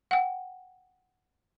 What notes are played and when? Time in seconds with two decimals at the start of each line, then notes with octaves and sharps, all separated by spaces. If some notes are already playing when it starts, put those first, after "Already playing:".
0.11 F#5 G5